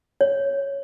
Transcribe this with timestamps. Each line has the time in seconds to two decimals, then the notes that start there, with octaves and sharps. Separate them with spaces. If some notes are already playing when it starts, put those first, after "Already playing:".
0.21 C#5